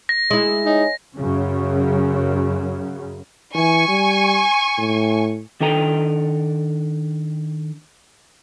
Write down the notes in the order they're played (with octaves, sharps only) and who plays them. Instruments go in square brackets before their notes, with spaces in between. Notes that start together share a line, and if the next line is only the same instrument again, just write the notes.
[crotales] A#6
[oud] G#3 E4
[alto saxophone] D#4 [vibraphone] C#5 D#5 G#5
[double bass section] F#2 C#3
[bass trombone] E3 [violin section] G#5 C#6
[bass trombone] G3
A2
[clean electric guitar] D#3 D4 A4 D#5 G5 A#5